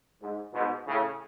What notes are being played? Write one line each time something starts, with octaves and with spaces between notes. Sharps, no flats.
G#2
G#2 B2
A2 C#3